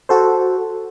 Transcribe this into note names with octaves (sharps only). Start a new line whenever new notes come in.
F#4 A4 C5